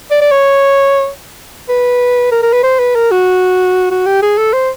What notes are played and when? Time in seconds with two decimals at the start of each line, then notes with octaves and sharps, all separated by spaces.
0.11 D5
0.22 D5
0.32 C#5
1.69 B4
2.32 A#4
2.43 A#4
2.53 B4
2.63 C5
2.79 B4
2.95 A#4
3.11 F#4
3.91 F#4
4.06 G4
4.22 G#4
4.38 A4
4.53 C5